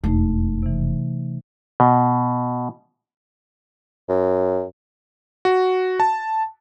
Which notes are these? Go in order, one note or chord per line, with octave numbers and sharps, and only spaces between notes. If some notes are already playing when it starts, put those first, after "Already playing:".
E1 F2 A3 D#4
C3 E3
B2
F#2
F#4
A5